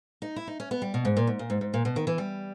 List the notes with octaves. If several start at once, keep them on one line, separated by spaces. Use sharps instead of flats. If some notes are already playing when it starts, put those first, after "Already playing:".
D#4
E4
D#4
C#4
B3
G3
B2
G#2
A#2
G#2
A#2
G#2
G#2
A#2
B2
D#3
E3
G3